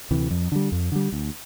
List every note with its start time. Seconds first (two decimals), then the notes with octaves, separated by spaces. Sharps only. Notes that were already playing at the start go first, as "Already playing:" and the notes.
0.11 D2 C3 E3
0.31 F2
0.52 D3 G3
0.72 F2
0.92 D3 G3
1.12 D2